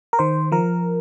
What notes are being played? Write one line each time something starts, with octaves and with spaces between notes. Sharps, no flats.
A#4
D#3 C5
F3 A#4